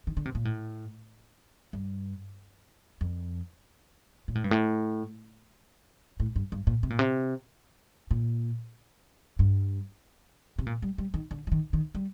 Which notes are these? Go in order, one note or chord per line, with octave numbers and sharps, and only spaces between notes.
D#3
D3
C3
A#2
A2
G2
F2
A#2
A2
G2
A2
A2
G2
G2
A#2
C3
A#2
C3
A#2
G2
C3
A#2
G3
G3
D#3
D3
F3
D#3
D#3
G3